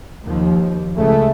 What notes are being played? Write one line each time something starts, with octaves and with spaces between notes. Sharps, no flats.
D#2 F3
C#2 C#3 G#3 A3